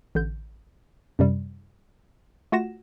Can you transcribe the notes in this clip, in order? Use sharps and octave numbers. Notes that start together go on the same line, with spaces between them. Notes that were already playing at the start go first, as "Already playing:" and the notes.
A1 D3 G6
F#2 C3 G3
A3 F4 F#4 F#5 A#6 E7